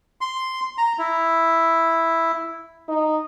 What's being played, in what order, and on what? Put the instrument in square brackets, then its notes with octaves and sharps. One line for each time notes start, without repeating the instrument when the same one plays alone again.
[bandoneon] C6
A#5
E4
[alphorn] D#4